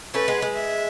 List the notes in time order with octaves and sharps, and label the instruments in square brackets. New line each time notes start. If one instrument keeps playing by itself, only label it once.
[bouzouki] A3 C#4 [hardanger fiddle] B4
[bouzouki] G#3 B3
G#3
[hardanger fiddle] E5